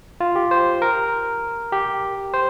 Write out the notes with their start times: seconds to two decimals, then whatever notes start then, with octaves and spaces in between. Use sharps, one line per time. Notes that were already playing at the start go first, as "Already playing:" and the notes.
0.20 F4
0.36 G4
0.51 C5
0.82 A#4
1.72 G4
2.34 C5